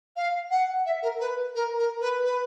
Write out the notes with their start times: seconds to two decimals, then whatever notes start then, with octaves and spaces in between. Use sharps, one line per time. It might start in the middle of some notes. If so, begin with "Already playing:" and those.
0.16 F5
0.50 F#5
0.85 E5
1.02 A#4
1.20 B4
1.55 A#4
1.78 A#4
2.00 B4
2.24 B4